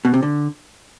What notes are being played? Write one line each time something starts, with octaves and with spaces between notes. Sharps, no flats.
B2
C3
D3